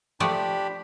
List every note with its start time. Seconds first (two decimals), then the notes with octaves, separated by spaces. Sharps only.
0.20 F3 A3 D4 G4 D5 B5